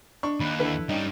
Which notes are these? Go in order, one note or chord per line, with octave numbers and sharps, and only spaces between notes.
D4 C#6
D#2 B5 F#6
D3 E4 A4 B4
G2 G3 C#4 D#4